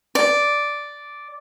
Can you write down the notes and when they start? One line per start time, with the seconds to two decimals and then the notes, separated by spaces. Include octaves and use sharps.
0.15 D5